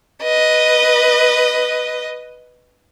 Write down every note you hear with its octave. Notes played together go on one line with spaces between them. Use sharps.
B4 D#5